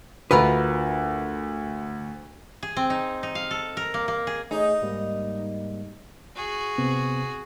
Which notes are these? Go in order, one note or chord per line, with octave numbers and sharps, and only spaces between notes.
D2 F4 A#4 B4
G#4
C4
D#4
D#4
F5
A4
A#4
A#3
A#3
G#4
A3 D#4 G#4 C#5
G#2 G3 A#3
F#4 G#4
C3 B3 C4